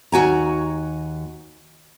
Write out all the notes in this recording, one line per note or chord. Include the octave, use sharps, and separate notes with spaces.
D#2 F#4 G#5 A#5